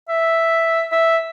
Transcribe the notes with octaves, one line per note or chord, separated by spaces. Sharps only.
E5
E5